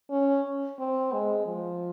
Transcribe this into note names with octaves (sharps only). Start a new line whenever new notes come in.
C#4
C4
G#3
F3